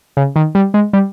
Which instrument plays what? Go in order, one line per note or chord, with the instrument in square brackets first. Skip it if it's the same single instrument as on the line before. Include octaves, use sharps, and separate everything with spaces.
[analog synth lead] C#3
D#3
G3
G#3
G3